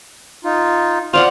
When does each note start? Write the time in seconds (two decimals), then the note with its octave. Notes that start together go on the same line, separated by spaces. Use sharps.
0.44 D#4 F4
1.13 F4 C5 D5 F#5